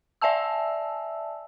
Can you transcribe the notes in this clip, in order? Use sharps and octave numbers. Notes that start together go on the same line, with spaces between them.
D5 E5 G#5 A5 E6